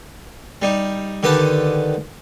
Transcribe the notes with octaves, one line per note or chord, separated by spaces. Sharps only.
G3 D#4
D3 D#3 G4 B4 A5